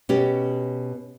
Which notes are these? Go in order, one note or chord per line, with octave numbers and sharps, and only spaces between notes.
B2 C#4 G4